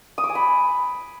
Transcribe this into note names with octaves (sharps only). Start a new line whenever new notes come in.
D#6
D6
G#5
B5